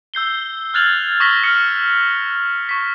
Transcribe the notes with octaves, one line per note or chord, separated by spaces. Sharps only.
E6 G6 C7 G7
F6 F#6 G#6 A6 F7 F#7
C#6 D#6 A#6 B6 G7
D#6 F6 A#6 C#7
C#6 B6